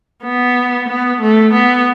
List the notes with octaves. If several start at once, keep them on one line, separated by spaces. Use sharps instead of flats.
B3
B3
A3
B3